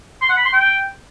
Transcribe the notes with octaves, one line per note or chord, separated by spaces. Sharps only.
C6
F#5
B5
C6
G5